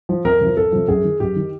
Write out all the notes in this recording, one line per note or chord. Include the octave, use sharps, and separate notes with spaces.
F3
F2 A#4
C3 F3
F2 A4
C3 F3
F#2 G#4
D#3
F#2 G4
D#3